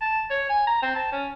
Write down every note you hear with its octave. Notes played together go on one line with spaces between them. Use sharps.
A5
C#5
G#5
A#5
C4
A5
C#4